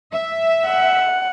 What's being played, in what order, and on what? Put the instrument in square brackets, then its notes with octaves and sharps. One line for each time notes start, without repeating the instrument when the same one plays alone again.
[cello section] E5
[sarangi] F#5